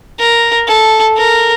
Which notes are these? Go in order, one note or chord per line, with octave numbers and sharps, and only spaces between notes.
A#4
A4
A#4